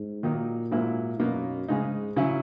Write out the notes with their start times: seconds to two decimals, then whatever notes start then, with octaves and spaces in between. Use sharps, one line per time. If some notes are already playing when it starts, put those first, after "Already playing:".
Already playing: G#2
0.23 A#2 D#3 F#3 A#3 D#4
0.72 G#2 F#3 A#3 E4
1.19 F#2 B2 A#3 D#4
1.69 G#2 C#3 G#3 D#4
2.16 C#3 F#3 C#4 E4